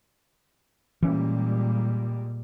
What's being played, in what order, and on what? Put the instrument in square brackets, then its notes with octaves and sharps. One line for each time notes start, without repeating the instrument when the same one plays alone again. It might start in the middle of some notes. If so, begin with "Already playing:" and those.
[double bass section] A#2 G3 G#3 [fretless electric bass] E3 C#4